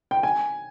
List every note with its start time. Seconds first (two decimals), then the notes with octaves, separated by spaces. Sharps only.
0.11 G5
0.23 G#5